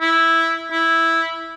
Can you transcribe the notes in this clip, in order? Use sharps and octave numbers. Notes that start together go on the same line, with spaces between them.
E4
E4